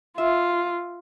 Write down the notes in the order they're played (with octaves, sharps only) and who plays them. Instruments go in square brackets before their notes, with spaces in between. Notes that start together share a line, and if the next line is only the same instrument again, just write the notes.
[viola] F4 [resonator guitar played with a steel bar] E5